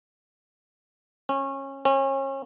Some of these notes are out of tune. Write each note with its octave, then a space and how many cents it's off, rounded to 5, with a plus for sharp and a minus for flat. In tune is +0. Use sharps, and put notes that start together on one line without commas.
C#4 -25
C#4 -35